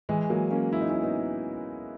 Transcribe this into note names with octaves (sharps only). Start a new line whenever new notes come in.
E3 G#3
F#3 A#3
A#3 C#4
E4
D#4
C#4 E4
B3 D#4